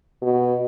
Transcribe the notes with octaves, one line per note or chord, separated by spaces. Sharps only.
B2